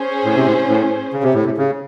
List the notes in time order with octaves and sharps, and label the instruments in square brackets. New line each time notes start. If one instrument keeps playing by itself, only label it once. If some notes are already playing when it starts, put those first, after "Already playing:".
Already playing: [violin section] C#4 G#4 C5
[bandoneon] A2
C3
A2
A2
C#3
C3
A2
C3
C#3